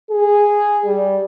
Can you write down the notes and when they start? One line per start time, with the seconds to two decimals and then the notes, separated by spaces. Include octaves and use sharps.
0.10 G#4
0.86 G3